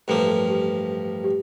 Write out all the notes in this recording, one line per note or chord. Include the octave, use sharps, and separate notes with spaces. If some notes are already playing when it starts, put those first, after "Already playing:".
A1 G2 F3 A#3 A4
A4
G4
G4